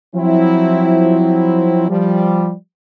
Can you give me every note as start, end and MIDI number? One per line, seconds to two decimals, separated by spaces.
0.15 1.86 53
0.15 1.86 54
0.15 1.86 60
0.15 1.86 64
1.89 2.54 53
1.89 2.54 55